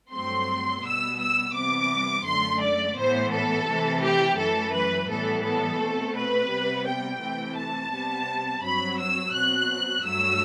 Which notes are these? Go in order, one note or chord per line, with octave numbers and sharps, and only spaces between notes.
G2 F#3 A3 C4 C6
B2 G3 B3 E6
E6
C3 E3 G3 B3 D6
F#2 D3 A3 C6
D5
A2 E3 B3 C5
A4
C3 E3 A3
G4
F#2 E3 A3 A4
B4
A2 E3 G3 B3 A4
A4
B2 A3 C4
B4
C3 G3 B3
G5
C3 E3 A3
A5
C3 G3 B3
G2 F#3 C4 B5
E6
B2 F#3 C4 F#6
G2 F#3 A3 E6